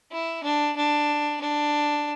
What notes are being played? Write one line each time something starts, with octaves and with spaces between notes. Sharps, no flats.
E4
D4
D4
D4